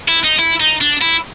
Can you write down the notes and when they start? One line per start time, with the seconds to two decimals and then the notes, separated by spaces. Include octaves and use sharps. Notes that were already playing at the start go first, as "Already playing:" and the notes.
0.08 E4
0.24 D#4
0.39 E4
0.60 D#4
0.81 D4
1.02 E4